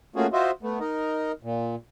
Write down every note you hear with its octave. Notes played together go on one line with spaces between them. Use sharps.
A3 A#3 C#4 F4 F#4 G#4
F4 F#4 C5 D#5 E5
A3 B3
D#4 A#4 D#5
A#2